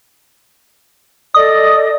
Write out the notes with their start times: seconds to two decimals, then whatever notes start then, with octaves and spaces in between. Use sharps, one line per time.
1.34 A4 D5 D#5 D#6